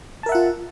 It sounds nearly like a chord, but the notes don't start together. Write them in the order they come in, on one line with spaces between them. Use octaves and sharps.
A5 A#4 E5 F#5 F4